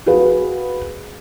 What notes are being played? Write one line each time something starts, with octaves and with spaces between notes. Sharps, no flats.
F#4 G#4 B4 F5